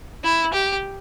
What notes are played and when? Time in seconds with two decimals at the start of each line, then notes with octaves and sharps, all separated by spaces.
0.24 E4
0.54 G4